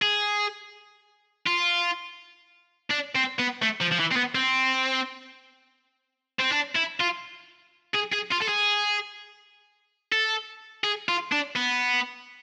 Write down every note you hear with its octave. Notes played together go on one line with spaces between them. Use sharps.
G#4
F4
D4
C4
B3
A3
F3
F3
E3
C4
B3
C4
C4
D4
E4
F4
G#4
G#4
F4
A4
G#4
A4
G#4
F4
D4
B3